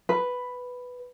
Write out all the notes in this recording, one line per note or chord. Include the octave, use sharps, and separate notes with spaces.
B4